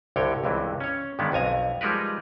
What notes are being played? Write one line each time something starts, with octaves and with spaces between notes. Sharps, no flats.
C2 G2 D3 C#5 G5
C#2 G2 C3 E3
C#4 C#5
G2 D3 D#3 G#3 B3
B1 F2 G#5 A#5
F3 G3 G#3 D#4 A#4 B4